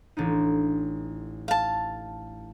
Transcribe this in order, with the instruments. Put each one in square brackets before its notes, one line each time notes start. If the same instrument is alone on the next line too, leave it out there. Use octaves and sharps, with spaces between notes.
[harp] A1 D4 D#4
[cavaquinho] F5 A5